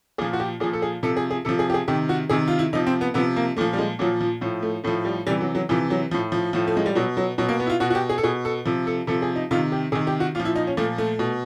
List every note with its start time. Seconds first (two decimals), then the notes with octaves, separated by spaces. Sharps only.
0.18 A#2 F3 G#4
0.33 F#4
0.40 G4
0.60 A#2 F3 G#4
0.73 A4
0.82 G#4
1.03 C3 F3 A4
1.17 G#4
1.31 G#4
1.45 C3 F3 A4
1.59 G#4
1.70 G4
1.74 G#4
1.88 C3 D#3 G4
2.09 F#4
2.30 C3 D#3 G#4
2.48 F4
2.59 E4
2.73 C3 F3 D#4
2.86 C4
3.01 B3
3.14 C3 F3 B3
3.36 A#3
3.57 A#2 F3 A3
3.73 G3
3.78 G#3
3.99 A#2 F3 F#3
4.21 F3
4.41 A2 F3
4.63 A3
4.84 A2 F3 A3
5.05 G3
5.27 C3 E3 G3
5.41 F#3
5.55 F#3
5.69 C3 E3 F3
5.90 F#3
6.11 F3
6.14 A2
6.32 F3
6.53 A2 F3
6.67 A3
6.77 G#3
6.86 G3
6.95 B2 F#3
7.17 F#3
7.38 B2 F#3
7.49 A#3
7.60 B3
7.66 E4
7.70 F4
7.80 B2 F#4
7.90 F#4
7.95 G4
8.09 G#4
8.18 A4
8.23 B2 G#4
8.45 A4
8.65 C3 F3
8.87 A4
9.07 C3 F3 A4
9.22 G#4
9.36 D#4
9.51 C3 D#3 F4
9.72 G4
9.92 C3 D#3 G#4
10.07 G4
10.20 F#4
10.35 A#2 F3 F4
10.45 E4
10.56 D#4
10.67 C#4
10.77 A#2 F3 A3
10.98 A3
11.19 B2